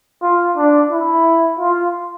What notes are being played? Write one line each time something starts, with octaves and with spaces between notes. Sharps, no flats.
F4
D4
E4
F4